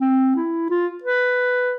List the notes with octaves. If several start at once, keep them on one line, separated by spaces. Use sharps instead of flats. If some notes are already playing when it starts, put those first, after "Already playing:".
C4
E4
F4
B4